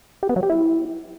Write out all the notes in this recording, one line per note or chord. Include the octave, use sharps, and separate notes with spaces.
G4
B3
F#3
G4
E4